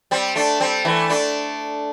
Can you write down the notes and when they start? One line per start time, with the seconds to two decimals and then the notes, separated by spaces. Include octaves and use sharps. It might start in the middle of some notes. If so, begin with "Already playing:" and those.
0.11 G3 C4
0.36 A3 D4
0.60 G3 C4
0.85 E3 A3
1.09 A3 D4